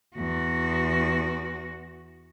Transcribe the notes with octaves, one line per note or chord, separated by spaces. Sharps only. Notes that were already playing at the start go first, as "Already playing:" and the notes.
E2 F#4